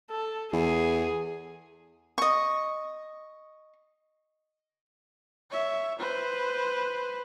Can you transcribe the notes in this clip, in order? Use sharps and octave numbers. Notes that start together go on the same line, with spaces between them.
A4
E2 G#4
D#5 C#6
C#5 E5
B4 C5